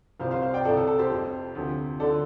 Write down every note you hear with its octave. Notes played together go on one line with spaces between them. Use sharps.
C2 C3 F3 C5 F5
C5 F5
C5 F5
D5 G5
C2 C3 F3 A4 D5
A4
A4
G4 C5
F2 C3 F3
D2 C3 F3
D2 D3 F3 A4 D5